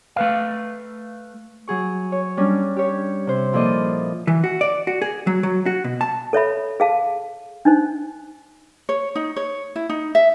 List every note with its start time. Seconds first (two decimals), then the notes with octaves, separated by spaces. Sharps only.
0.16 A3 B4 F5
1.68 F#3 G#4 C#6
2.12 C#5
2.37 G3 C#4 D4
2.77 G4 C#5
3.27 C3 C5
3.53 A#2 F3 E4 A4 D5 D#5
4.27 E3
4.44 F#4
4.61 D5
4.87 F#4
5.02 G#4
5.27 F#3
5.43 F#3
5.66 F#4
5.84 B2
6.01 A5
6.33 A4 C#5 E5 B5
6.80 G#4 F5 A5
7.65 D4 D#4 C5
8.89 C#5
9.15 D#4
9.36 C#5
9.76 E4
9.89 D#4
10.15 E5